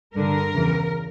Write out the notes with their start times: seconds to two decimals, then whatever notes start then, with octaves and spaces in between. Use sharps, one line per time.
0.15 G2 D3 A#4
0.53 E2 C#3 E3